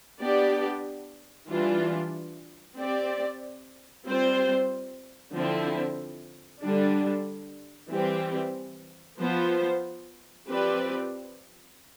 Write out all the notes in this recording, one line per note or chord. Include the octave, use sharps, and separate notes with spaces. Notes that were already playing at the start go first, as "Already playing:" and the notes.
B3 D4 G4 D5
E3 G3 D4 F4
C4 G4 D5
G3 C4 F4 C5
D3 F3 C4 E4
D3 G3 D4
E3 G3 C4 G4
F3 B3 F4 C5
F3 C4 G4 B4 D5